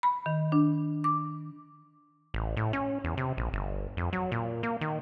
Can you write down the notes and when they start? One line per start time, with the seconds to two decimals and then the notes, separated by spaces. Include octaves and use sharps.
0.03 B5
0.26 D#3
0.52 D4
1.04 D6
2.34 A1
2.57 A2
2.73 C#4
3.04 E2
3.17 C3
3.37 A#1
3.53 G1
3.97 F2
4.13 F#3
4.32 A#2
4.63 A#3
4.81 D#3